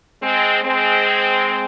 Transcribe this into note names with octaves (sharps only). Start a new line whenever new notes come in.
G#3 C4
G#3 C4